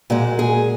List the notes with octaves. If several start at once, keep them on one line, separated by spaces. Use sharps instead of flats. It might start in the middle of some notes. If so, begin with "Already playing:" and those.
A#2 G#3 F#4
G#4